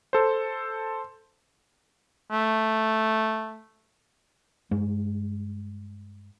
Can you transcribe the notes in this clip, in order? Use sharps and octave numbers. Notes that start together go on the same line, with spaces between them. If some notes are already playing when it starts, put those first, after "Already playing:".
A4 C5
A3
G2 G#3